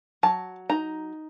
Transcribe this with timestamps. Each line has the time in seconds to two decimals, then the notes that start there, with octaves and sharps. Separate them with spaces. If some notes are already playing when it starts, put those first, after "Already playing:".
0.23 F#3 A5
0.70 D#4 A#5